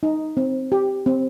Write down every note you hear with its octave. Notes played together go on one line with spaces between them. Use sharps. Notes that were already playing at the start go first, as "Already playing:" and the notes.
D#4
C4
G4
C4